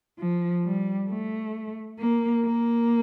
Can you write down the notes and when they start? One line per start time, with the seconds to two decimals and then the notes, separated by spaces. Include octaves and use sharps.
0.19 F3
0.65 G3
1.09 A3
1.99 A#3
2.45 A#3